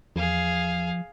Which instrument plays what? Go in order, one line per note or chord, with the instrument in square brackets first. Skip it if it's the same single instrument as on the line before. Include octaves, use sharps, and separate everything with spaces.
[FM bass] E2 [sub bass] F3 [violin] G#4 F5